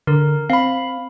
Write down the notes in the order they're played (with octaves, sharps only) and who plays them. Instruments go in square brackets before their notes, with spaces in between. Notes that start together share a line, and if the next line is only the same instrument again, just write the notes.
[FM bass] D3 [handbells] A#4
[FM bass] C4 [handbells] F5 B5